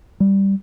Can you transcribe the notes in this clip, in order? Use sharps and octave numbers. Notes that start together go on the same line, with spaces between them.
G3